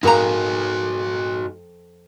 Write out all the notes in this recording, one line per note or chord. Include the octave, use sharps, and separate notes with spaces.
F2 G#2 D#4 F#4 A#4 F5 A#5